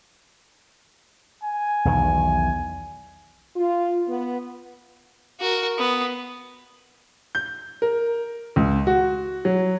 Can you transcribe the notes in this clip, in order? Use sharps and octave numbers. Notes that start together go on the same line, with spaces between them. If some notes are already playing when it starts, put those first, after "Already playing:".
G#5
B1 E2 D#3
F4
B3
F#4 A#4
B3
G6
A#4
C#2
F#4
F#3